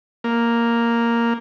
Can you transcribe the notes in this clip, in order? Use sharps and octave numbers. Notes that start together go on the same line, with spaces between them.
A#3